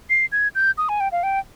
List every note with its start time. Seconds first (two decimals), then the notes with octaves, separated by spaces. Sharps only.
0.10 C7
0.32 G#6
0.55 G6
0.78 D#6
0.89 G#5
1.00 G5
1.12 F5
1.23 G5